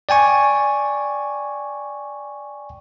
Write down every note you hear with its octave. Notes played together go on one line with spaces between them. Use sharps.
D5 G5 G#5 C#6